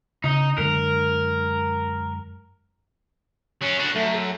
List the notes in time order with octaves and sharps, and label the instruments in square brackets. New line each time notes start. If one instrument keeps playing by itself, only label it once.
[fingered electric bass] C#3 [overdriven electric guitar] D#4
[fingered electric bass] F#2 D3 G#3 [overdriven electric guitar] A#4
[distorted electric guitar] F#3 C#4
D4 F#4
[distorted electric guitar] F#2 [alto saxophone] A3
[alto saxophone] A4